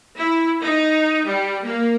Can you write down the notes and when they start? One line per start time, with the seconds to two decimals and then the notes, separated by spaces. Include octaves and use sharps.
0.17 E4
0.65 D#4
1.28 G3
1.65 A#3